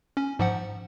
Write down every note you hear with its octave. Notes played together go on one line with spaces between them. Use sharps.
C#4
G#2 F3 F#5